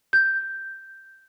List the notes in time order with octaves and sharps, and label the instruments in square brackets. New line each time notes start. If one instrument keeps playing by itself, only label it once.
[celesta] G6